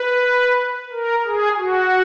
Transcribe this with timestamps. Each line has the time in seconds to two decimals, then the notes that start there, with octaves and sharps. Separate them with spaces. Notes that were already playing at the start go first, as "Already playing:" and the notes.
Already playing: B4
0.92 A#4
1.25 G#4
1.58 F#4